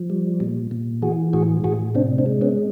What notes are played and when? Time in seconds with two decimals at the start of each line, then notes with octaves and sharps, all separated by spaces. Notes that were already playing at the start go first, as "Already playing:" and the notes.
Already playing: F3
0.10 G3
0.40 A#2
0.71 A#2
1.02 E3 F#4 G#4
1.33 A2 F#4 G#4
1.64 A2 F#4 G#4
1.95 C3 C4 D4
2.18 C4 D4
2.26 G#3
2.41 B3 C#4